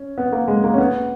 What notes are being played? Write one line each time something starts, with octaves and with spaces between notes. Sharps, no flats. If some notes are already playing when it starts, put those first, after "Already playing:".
Already playing: C#4
B3
A#3
G#3
A#3
C#4
B3